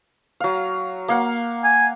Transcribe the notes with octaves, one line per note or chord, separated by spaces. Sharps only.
F#3 F5
A#3 F5 F#5
G#5